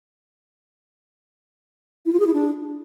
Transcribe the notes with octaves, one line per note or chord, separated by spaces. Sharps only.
E4
F4
G#4
E4
D4